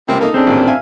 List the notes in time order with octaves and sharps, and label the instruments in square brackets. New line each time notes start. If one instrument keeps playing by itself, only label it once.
[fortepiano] C#2 C3 A#3 [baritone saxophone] C4
[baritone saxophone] A#3 [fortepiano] D#4 A4
[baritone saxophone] C#3 [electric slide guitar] C4 D4
[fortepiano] A1 D#2 A#2
E5 F5 G#5